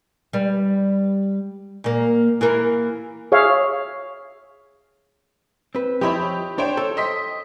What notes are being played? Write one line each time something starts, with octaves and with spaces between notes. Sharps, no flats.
G3 B4
A#2 A#3
E3 A#3 A#4
G#4 C#5 E5 F5
C4 B4
F3 E4 G4 C#5 D#5 B5
D4 C5 C#5 G5
A4
D#5 C6 B6